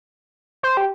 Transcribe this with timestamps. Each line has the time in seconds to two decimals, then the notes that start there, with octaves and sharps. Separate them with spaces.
0.63 C5
0.77 G4